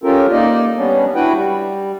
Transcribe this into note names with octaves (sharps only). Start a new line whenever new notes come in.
C#4 F4 G4 A4 A#4
A#3 D#4 D5 D#5
G3 B3 C#4 D4
D4 E4 F#4 B4 F#5 G5
G3